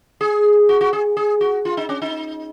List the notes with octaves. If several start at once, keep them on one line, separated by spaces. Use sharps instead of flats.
G#4
F#4
F#4
G#4
G#4
F#4
F4
D#4
C#4
D#4